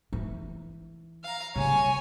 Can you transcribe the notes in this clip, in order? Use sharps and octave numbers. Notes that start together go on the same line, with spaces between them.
E3
F5 A#5
C#3 G3 C#5 G#5